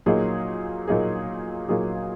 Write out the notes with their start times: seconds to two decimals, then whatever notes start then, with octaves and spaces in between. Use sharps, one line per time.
0.06 A#2 F#3 A#3 D#4 G#4
0.88 A#2 F#3 A#3 D#4 G#4
1.69 A#2 F#3 A#3 D#4 G#4